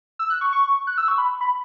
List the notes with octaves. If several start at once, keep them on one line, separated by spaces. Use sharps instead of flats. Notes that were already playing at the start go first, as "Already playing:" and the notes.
E6
F#6
C#6
C#6
F#6
E6
C#6
B5
B5